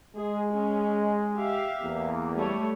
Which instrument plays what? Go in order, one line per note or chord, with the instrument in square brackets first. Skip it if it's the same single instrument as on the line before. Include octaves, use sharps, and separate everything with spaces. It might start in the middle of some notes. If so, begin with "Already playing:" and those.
[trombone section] G#3 [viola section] G#4
[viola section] C#4
G4 E5 F5
[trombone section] E2 A#3
[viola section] G3 A3 C#5